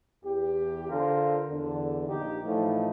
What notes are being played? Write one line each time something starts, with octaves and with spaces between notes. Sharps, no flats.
E2 G4
D3 F4 A#4 C5
E2 D3
A#1 D#4 G4
A2 E3 F3 D#4